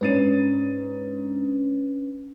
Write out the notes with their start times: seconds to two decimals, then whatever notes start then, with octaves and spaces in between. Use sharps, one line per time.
0.01 G#2 C#4 D4 B4 A6 D#7